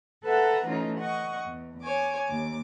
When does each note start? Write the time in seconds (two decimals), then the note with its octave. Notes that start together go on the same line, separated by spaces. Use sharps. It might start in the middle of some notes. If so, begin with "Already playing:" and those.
0.24 A4 B4 E5 F#5 A#5
0.66 E3 A3 C#4 D#4 F4
0.98 D#5 F#5 C#6
1.45 E2
1.82 C#5 G#5 D6
2.27 D#2 D6